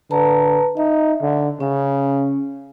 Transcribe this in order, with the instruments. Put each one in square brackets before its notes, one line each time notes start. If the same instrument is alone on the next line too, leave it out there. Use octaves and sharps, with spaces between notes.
[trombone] D3 [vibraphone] B4 A5 A#5
[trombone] D#4 [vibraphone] E5
[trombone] D3
[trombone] C#3 [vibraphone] C#4